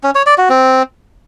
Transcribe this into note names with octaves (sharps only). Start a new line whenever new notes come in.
C#4
C#5
D5
F#4
C4